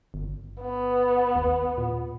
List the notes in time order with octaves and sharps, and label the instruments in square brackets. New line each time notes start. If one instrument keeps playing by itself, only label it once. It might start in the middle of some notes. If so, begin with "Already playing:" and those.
[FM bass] G1
[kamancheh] B3
[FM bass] D#2
A#2